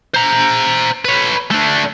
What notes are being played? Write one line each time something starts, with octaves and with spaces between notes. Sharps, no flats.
C5 A#5
B4 C#5
A3 D4